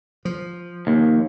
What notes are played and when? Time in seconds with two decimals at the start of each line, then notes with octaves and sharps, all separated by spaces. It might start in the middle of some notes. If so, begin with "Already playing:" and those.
0.25 F3
0.87 D#2